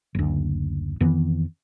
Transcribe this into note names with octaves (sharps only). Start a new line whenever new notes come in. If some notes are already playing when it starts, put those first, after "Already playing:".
F#1 D2
F2 D#3 E3 B3